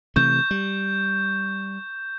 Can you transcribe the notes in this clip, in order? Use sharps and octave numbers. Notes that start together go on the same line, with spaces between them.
C3 E3 A3 C#6 G6
G3